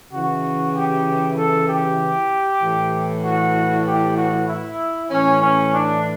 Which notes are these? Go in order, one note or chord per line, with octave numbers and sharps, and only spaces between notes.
C#3 E3 F#4
G4
A4
G4
A2 E3
F#4
G4
F#4
E4
A2 E3 C#4
C#4
D4